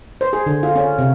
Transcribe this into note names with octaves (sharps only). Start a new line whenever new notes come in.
C5
G#4
D3
F4
C#4
C3